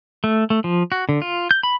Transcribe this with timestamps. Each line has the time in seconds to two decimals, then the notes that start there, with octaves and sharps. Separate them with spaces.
0.24 A3
0.50 A3
0.64 F3
0.92 F#4
1.09 D3
1.22 F4
1.51 G6
1.63 B5